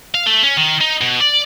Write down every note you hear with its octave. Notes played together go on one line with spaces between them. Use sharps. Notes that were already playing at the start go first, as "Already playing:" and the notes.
F5
A3
C#4
D#3
D#4
B2
D5